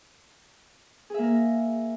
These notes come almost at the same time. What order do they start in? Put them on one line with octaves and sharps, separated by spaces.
G#4 E5 A#3 A#4